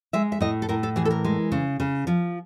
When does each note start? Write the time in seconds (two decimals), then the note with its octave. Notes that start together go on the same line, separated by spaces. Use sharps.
0.13 G#3 E5
0.32 E5
0.41 A2 D#5
0.62 A4
0.69 A2 A#4
0.83 A4
0.96 E3 G#4
1.05 A4
1.10 A#4
1.24 G#3
1.52 C#3
1.80 C#3
2.07 F3